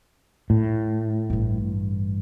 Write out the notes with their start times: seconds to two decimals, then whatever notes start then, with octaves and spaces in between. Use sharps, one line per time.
0.50 A2
1.30 A1 G2